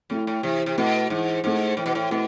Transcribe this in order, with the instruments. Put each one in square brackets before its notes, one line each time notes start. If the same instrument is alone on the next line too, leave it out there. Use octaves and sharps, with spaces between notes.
[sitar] A2 [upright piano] A3 E4
[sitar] A2
[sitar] C3 [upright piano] E3
[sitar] C3
[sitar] B2 [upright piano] A3 E4
[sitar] G#2 [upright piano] E3
[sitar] G#2 [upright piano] A3 E4
[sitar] A2 [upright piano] E3
[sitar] B2
A2
[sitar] B2 [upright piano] A3 E4